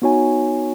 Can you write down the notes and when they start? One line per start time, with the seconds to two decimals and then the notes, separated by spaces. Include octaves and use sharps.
0.02 B3 D#4 F#4 C#5 G#5